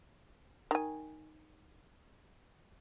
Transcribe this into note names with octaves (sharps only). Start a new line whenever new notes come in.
D#3 G#5